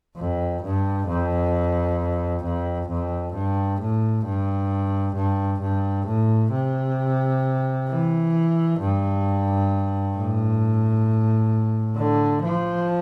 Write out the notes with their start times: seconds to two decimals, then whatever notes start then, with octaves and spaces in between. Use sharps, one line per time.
0.17 F2
0.63 G2
1.07 F2
2.44 F2
2.90 F2
3.34 G2
3.81 A2
4.25 G2
5.16 G2
5.62 G2
6.07 A2
6.53 C3
7.89 E3
8.80 G2
10.16 A2
11.97 D3
12.43 F3